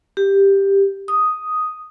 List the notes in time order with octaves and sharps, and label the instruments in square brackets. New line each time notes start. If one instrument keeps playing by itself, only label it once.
[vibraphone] G4
D#6